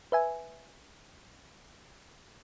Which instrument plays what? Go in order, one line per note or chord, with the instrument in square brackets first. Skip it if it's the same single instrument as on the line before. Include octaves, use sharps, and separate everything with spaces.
[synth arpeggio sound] B4 E5 G#5